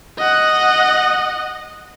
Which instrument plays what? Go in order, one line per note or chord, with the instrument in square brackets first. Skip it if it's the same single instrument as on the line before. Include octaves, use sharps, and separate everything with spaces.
[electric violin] D#5 F#5